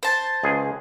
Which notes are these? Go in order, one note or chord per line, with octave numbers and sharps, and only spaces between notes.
C5 A5
C#2 G#4